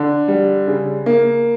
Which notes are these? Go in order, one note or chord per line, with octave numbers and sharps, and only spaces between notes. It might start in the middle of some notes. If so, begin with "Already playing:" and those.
Already playing: D3
G3
C#3
A#3